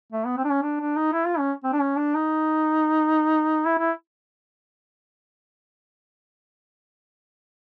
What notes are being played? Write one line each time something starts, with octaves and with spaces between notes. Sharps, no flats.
A3
B3
C4
D4
C#4
D4
D4
D#4
E4
F4
C#4
C4
D4
C#4
D4
D#4
E4
E4